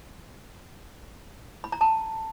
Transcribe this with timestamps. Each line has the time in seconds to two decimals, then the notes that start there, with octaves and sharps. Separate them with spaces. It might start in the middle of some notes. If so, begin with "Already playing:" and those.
1.64 B5
1.72 A#5
1.81 A5